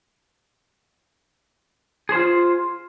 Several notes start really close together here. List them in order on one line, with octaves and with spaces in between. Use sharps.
G#4 C5 F4